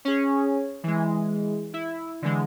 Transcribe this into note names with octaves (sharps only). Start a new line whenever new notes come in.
C#4 G#4
E3 G#3
E4
D3 E3 G#3